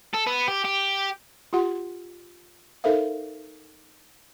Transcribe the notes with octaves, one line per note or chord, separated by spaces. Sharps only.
A4
B3
G4
G4
F4 G4 F#5 C6
D#4 A4 A#4 C5 E5 F5